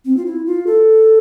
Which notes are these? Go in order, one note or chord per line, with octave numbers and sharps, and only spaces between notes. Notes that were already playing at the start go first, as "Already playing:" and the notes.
C4
F4
E4
F4
A4